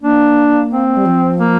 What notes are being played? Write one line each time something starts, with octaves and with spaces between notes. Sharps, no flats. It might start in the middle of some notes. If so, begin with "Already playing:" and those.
A#3 D4
C4
G3
F3
A#3